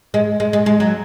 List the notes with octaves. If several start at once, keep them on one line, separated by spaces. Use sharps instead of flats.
G#3
G#3
G#3
G#3
F#3